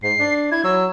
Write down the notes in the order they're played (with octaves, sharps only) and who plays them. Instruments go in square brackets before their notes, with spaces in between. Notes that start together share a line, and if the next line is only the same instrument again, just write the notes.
[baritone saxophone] G#2 [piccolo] C7
[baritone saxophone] D4
[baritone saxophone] E4 [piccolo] G#6
[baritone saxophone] F#3 [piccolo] E6